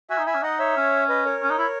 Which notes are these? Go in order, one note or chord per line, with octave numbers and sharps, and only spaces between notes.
F#4 E5 G#5
D#4
E4 E5 G#5
C#4
D#4 D#5 F#5
C#5 E5
C#4
B4 D#5
A#4 C#5
C#4
D#4
E4